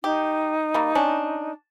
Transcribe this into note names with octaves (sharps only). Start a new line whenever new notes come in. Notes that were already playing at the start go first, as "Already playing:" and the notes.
D#4 G4
G3 A#3
C#4 D4